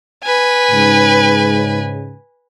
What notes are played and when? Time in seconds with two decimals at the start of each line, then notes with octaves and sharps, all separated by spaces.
0.24 B4 G#5
0.71 G#2 C#3